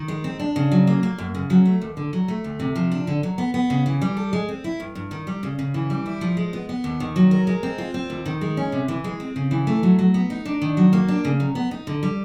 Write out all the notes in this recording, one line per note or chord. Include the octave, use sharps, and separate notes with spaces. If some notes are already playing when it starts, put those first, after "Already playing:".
Already playing: D#3
G#3
C4
D4
C#3
F#3
A#3
A#3
F#2
C#3
F#3
A3
D#2
D3
F#3
A3
D2
C3
F3
D4
D3
F#3
B3
B3
C#3
E3
G3
A4
G#3
C4
E4
G2
G2
D#3
G3
C#3
C#3
E3
G3
E4
F3
G#3
B3
B3
D#2
D#3
F#3
A#4
G#3
C4
F4
C4
D#2
D#3
G#3
C#4
C3
E3
G#3
C4
C#3
E3
A3
F#3
F#3
B3
D#4
D4
D#3
F#3
A#3
D4
C#3
F#3
B3
D#4
D3
G3